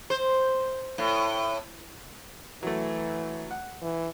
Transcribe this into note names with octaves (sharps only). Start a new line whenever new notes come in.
C5
A2
E3 F#3 A3
F#5
E3